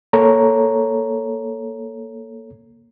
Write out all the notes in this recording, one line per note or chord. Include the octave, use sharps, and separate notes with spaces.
A#3 A4 C#5 A#5